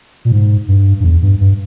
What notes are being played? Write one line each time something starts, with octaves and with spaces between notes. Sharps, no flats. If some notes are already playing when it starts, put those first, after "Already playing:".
A#2
G#2
G2
G2
E2
G2
G2